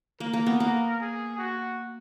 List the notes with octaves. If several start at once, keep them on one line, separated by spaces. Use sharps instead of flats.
A#3 A#4
A#3
B3
A#3
G#4
F#4